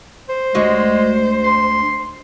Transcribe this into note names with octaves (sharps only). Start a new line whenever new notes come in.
C5
D2 G#3 F#4 D#5
C6